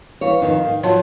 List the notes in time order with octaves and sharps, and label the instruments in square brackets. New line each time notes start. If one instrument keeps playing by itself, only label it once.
[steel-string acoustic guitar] E3 C#5 [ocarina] F5
[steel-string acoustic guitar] F2 D#3
D#3
[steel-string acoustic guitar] F3 F#3 [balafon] F4 C#5 [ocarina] A5